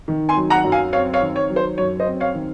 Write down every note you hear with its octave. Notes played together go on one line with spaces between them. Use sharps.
D#3
G#5 C6
F#3
F#5 A#5
F#2
F5 G#5
C4 C#5 F5
C#5 F5
D#3
C#5
F#3
C5
F#2 C#5
C5 D#5
C4
C#5 F5
D#3